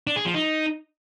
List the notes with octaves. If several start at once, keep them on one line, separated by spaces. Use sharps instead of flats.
D4
G#4
F3
D#4